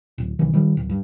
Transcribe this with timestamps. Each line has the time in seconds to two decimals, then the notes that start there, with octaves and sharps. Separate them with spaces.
0.18 D1
0.39 B1 D#3 E3
0.53 D#3 G3
0.77 D1
0.89 G2